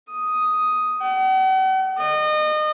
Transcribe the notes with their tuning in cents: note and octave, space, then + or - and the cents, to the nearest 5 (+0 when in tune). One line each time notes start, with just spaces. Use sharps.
D#6 +5
F#5 +45
D#5 -30